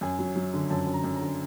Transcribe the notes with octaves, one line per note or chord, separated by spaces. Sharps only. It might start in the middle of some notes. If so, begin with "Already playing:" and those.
F#2 G#5
F#3
F#3
D3
F#2 A5
F#2
A#5
F#2
A#5
D3